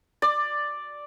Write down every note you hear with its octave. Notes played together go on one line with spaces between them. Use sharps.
D5